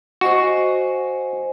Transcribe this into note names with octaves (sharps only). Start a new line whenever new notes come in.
F#4 C5 D#5 G#5